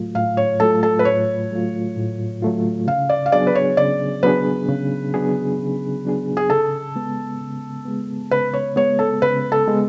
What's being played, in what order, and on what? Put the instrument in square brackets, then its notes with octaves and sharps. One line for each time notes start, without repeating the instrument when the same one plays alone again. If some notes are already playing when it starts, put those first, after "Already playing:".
Already playing: [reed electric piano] A2 F#3 A3 F4
[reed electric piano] A2 [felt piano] F5
[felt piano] C#5
[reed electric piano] F#3 A3 F4 [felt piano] A4
[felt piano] A4
B4
[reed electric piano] A2 [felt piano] C#5
[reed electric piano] F#3 A3 F4
A2
F#3 A3 F4
[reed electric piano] C#3 [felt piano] F5
[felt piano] D5
F5
[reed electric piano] F#3 B3 D4 G#4 [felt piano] D5
[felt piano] B4
C#5
[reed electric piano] C#3 [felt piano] D5
[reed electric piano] F#3 B3 D4 G#4 [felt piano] B4
[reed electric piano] C#3
F#3 B3 D4 G#4
C#3
F#3 B3 D4 G#4
[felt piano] G#4
[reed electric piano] C#3 [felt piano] A4
[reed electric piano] G#3 B3
C#3
G#3 B3
[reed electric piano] C#3 [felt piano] B4
[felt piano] C#5
[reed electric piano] G#3 B3 [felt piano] C#5
[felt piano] A4
[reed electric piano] C#3 [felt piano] B4
[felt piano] A4
[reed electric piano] G#3 B3